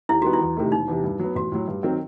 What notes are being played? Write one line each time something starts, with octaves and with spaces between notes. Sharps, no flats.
D#2 E4
D#3 G3 B3 F#4
E4
E2
C3 D#3 A3
E1 D#4
E2 C3
G2
F#3 B3
A1 F#4
A2 F#3
G2
D#3 F#3 C4